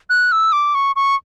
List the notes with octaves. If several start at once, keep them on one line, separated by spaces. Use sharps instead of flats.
F#6
E6
D6
C#6
C#6